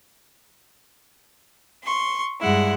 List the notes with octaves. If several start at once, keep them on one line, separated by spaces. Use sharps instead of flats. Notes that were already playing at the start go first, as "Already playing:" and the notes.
C6 C#6
G2 G#3 E4 F#5